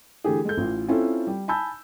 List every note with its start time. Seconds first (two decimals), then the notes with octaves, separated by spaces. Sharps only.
0.24 D3 E3 A3 G4 G#4
0.45 G#3 A4 G6
0.57 A1 E3 F4
0.88 C4 C#4 E4 F4 A4
1.27 G3
1.48 G#5 A5 B5 E6 G6